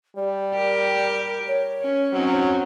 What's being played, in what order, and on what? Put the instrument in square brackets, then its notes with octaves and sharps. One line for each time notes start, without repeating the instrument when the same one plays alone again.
[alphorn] G3 [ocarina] D5
[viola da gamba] G4 A#4
[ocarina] C#5
[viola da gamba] C#4
[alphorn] F#3 [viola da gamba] C4 C#4 D#4